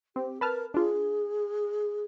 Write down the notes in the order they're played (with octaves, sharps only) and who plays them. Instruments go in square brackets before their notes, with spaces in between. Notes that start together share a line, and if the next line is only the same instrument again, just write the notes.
[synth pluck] C4 [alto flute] G4
[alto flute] A#4 [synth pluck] B4 A5 F6
[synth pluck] D4 F4 [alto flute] G#4